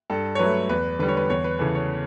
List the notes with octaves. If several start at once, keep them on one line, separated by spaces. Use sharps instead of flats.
G2 A4
C#5
F#3 A3 B4
E2 B4
D3 G3 B4
C#5
B4
E2 C#5
B4
C#3 E3 A4
C#5